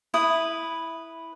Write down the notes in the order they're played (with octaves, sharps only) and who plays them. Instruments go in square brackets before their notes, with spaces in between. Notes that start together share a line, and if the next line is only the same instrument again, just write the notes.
[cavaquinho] E4 B4 D#6